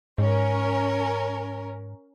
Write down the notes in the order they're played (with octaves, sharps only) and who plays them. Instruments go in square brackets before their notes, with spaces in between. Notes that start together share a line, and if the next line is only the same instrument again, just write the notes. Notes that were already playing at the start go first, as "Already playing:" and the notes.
[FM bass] G#2 [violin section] C#4 A#4